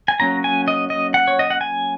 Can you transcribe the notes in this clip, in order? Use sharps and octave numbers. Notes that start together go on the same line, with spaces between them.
G#5
F#3 A#3 C#4 A#5
G#5
D#5
D#5
F#5
C#5
D#5
F#5
G#5